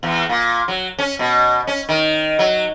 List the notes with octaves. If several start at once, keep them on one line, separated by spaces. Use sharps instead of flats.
E2
A#2
F#3
C#4
B2
C#4
D#3
F#3